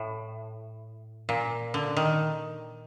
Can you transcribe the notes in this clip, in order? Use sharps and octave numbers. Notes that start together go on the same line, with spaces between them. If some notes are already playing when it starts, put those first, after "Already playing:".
Already playing: A2
A#2
D3
D#3